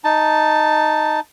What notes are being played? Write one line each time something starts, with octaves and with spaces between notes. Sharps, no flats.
D#4 A5